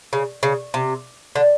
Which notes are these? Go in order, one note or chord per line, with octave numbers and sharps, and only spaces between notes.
C#3
C#3
C3
D3